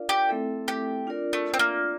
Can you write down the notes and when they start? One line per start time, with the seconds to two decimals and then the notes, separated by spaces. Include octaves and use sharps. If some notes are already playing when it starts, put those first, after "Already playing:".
Already playing: D4 F4 A#4 D5 F5
0.09 G4
0.29 A3 C4 E4 A4 E5
0.68 G4
1.07 D4 F4 A#4 D5
1.33 A3
1.54 C4
1.59 A#3